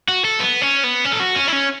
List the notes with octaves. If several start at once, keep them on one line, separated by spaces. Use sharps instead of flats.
F#4
A4
B3
C#4
B3
C#4
A4
F#4
C#4
E4
C#4